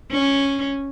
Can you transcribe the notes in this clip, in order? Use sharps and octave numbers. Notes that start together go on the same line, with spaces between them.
C#4